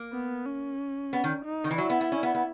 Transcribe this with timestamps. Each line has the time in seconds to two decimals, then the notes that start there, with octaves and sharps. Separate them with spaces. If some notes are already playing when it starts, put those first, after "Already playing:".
Already playing: A#3
0.13 B3
0.46 C#4
1.13 B3
1.24 D#3
1.45 D#4
1.64 D#3
1.71 E3
1.78 F#3 E4
1.90 B3
2.01 B3
2.12 C#4
2.23 B3
2.35 B3